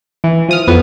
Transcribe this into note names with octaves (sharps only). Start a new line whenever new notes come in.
E3
F3 D#6 F6
F2 B3